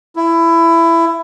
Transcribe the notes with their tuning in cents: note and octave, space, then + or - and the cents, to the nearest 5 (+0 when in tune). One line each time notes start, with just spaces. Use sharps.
E4 +15